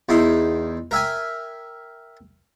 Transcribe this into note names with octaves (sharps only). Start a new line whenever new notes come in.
E2 D#4 E4 C6
A#4 E5 G5 G#5